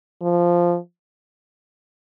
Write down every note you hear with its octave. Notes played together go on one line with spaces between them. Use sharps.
F3